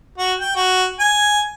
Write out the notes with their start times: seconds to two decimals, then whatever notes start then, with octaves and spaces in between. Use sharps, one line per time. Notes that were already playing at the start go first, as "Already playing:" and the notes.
0.18 F#4
0.40 G5
0.56 F#4
0.99 G#5